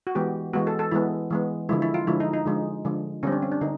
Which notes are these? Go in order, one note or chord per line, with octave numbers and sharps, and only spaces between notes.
F#4
E3 G#3 B3 G4
E3 G#3 B3 F#4
A4
A4
E3 G#3 B3 E4
E3 G#3 B3
D3 F3 G#3 E4
E4
F4
D3 F3 G#3 E4
D#4
D#4
D3 F3 G#3
D3 F3 G#3
D3 G3 C4 C#4
D4
C#4
D4
D3 D#4